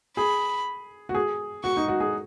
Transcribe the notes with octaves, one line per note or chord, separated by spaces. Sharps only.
G#4 B5
F#4
G#4
F#4 C#6
D#4
F#4
G#4